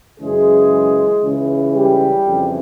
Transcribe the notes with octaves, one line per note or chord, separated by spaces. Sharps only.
F#2 C#3 E3 G#3 G#4
C#2 C#3 E3
G3 G4
F2 C#3 E3